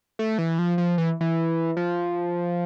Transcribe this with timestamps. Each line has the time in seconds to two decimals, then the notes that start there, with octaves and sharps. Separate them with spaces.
0.19 A3
0.38 E3
0.59 F3
0.78 F3
0.98 E3
1.21 E3
1.77 F3